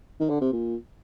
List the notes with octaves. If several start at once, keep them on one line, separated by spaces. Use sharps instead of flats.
D#3
D3
C3
A#2